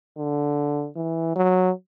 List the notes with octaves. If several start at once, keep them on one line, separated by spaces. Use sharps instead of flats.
D3
E3
F#3